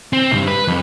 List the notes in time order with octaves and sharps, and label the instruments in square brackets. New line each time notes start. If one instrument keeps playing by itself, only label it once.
[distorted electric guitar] C4
B1 G2
B4
F2